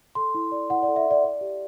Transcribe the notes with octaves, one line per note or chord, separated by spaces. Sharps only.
A4 C6
E4
D5
E4 F#5
D5
A4
E5
E4 D5
D5
G4